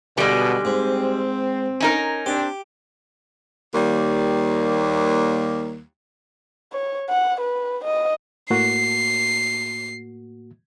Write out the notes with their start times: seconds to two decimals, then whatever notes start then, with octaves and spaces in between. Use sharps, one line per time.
0.18 B2 D3 G3 G#3
0.65 G#2 C4
1.80 C#4 D#4 A#4
2.26 C4 D4 G4
3.75 D#2 G3 A#3
6.73 C#5
7.10 F#5
7.41 B4
7.84 D#5
8.50 A2 A#3 F#4 C7